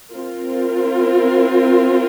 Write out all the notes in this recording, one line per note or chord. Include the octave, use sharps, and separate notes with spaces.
C4 F4 A#4